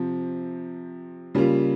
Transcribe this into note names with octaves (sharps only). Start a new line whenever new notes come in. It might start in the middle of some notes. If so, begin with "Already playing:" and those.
Already playing: C3 F3 C4
C#3 G3 A#3 F4